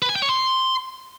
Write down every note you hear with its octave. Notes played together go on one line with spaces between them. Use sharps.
B4
G#5
G5
C#5
C6